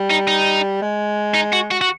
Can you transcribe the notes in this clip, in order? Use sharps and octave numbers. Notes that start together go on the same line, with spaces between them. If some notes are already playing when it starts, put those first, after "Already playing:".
Already playing: G3
D#4
D#4
G#3
D#4
F#4
F#4
F#4